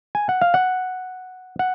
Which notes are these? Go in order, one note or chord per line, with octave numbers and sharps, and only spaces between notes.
G#5
F#5
F5
F#5
F#5